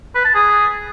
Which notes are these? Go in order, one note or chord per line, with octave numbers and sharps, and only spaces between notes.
B4
A5
G#4